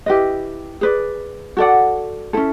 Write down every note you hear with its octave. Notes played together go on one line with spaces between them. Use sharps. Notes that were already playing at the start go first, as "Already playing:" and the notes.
E4 G4 B4 D#5
G#4 B4 D5
F#4 A4 D5 F#5
C#4 E4 A4